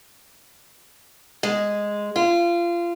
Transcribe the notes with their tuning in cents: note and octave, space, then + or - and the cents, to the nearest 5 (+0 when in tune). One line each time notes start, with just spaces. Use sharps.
G#3 -5
F4 -25